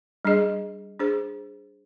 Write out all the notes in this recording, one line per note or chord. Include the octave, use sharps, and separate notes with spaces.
G3 D4 G#4 D#5
D4 G#4 C5